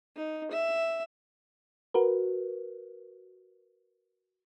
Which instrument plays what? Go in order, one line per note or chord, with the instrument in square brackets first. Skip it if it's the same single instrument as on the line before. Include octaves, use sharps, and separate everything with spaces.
[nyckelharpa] D#4
E5
[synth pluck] F#4 A#4 B4